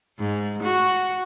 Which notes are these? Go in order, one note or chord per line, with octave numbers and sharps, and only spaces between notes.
G#2
F#4